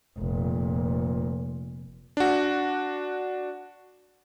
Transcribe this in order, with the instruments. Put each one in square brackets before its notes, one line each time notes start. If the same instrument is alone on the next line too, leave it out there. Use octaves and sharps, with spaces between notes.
[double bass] F1 A#2
[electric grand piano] D4 F#4